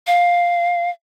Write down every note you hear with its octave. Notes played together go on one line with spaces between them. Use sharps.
F5